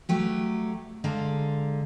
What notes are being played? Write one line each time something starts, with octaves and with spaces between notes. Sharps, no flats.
F#3 A3 G4
D3 G#3 F5 A#5